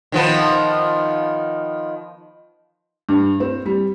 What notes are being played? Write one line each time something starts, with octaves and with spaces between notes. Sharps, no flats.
D#3 F3 B3
G2
C4
G3